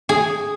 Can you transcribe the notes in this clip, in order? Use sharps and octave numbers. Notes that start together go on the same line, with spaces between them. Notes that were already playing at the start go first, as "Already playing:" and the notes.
G#4